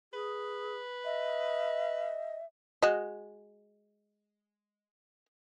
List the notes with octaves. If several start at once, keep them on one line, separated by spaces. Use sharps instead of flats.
G#4 B4
D#5 E5
G#3 F#4 D#5